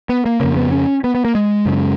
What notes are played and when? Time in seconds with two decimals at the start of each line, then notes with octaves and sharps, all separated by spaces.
0.09 B3
0.25 A#3
0.40 F2 C#3 A#3
0.57 B3
0.72 C#4
1.04 B3
1.15 B3
1.25 A#3
1.35 G#3
1.66 F#2 C#3